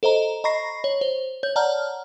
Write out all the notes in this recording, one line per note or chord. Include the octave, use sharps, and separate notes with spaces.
A4 C5 D#5 A#5
D#5 A#5 B5 C#6 A#6 C7
C#5
C5
C#5 G6
C#5 D5 F#5 A5 A#5 F6